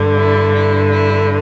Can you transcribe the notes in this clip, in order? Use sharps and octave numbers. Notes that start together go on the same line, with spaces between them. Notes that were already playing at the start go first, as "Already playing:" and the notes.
Already playing: G2 D3
E4
E4
E4